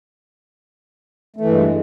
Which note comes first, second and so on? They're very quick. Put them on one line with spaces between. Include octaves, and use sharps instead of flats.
A3 E3 G2 G#3